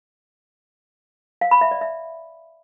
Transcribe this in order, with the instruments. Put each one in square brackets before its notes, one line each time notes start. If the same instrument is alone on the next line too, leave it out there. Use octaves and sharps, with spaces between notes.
[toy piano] F5
B5
E5
D5
E5